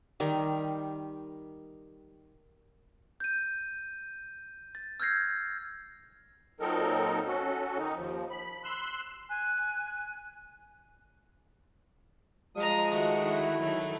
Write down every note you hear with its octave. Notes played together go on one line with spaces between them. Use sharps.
D#3 G3 G4
G6 D#7
A6
E6 F6 G6 G#6 A#6 C7
A#2 F#3 C4 D#4 A4 A#4
C#4 F#4 A4
D#3 D#4
D#2 F3
B5
C6 E6 F#6
G#5 F#6
F3 G#3 A#5 D#6
D#3 A3 F#4
E4
D#3 F#3 A3